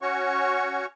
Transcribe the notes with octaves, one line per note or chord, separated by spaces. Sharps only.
C#4 F#4 C#5 C#6